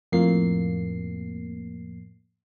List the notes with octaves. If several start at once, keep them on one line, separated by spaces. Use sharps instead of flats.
F2 A2 A#3 C7